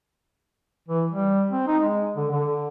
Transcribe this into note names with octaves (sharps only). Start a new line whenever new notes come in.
E3
G3
C4
D#4
G#3
D3
D3